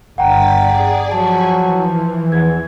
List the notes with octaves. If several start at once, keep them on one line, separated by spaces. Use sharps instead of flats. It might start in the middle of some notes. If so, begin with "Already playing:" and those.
G1 G2 F#5 G5 A#5 A6 B6
G#4 D5
F3 F#3 G#5 A5 B5 C#6
E3
E2 G#6